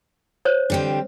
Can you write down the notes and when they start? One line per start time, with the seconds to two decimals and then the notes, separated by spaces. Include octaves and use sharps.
0.45 C5 C#5
0.70 D3 G3 C4